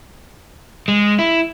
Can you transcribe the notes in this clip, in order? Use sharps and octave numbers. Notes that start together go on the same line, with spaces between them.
G#3
E4